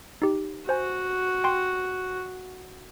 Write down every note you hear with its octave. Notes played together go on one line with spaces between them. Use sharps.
D#4 G4
F#4 C5 G#5
G5 C6